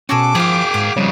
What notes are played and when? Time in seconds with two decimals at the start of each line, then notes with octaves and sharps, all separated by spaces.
0.09 B2 C#4 F#4 G#4 A4 D6
0.35 F3 F4 G#4 F5 G5 D#6
0.74 G#2 F5
0.97 F2 C#3 G3 C#5